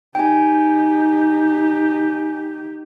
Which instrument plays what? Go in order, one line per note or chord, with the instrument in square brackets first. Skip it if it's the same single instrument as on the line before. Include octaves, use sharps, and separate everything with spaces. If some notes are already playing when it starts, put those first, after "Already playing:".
[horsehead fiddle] D#4 G4 [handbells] G5 G#5